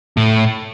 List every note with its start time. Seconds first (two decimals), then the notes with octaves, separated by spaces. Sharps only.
0.17 A2